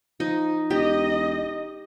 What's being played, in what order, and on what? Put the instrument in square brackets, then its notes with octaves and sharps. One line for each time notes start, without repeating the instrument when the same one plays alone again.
[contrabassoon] F3 [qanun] D#4
[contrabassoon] E1 [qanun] G4 [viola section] D#5